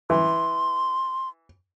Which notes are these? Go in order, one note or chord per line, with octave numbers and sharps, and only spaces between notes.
E3 C6